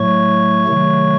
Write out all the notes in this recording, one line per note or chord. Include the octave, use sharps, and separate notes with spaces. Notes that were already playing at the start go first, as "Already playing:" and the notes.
Already playing: A2 F#3 A3 C#5 C#6
C3 D#3 F#3 A3